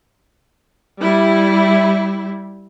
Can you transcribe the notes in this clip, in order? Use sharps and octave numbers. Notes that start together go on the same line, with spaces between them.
G3 E4